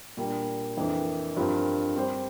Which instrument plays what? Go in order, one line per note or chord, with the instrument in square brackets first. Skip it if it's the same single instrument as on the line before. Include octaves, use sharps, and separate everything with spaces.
[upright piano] A#2 G3 A#3 D4
F2 E3 A#3 D4
G2 F3 C4 F4 A#4
G3 C4 G4 C5